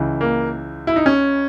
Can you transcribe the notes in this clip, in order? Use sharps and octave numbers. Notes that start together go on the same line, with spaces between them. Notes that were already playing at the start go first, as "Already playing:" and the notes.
Already playing: C#2 C#3 E3
A#3
E4
D#4
C#4